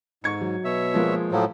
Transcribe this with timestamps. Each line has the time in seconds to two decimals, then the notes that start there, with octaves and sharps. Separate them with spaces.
0.24 G#2 C#6 G#6 C#7
0.41 F#3
0.65 B2 C#5 E5
0.94 F3 G#3 A#3
1.32 A2 F3 F#3